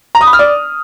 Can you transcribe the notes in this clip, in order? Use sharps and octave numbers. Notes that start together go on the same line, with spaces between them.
A#5
D#6
B5
F6
D5